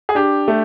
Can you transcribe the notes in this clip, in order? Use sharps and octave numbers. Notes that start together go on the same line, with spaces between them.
G#4
D4 G4
A3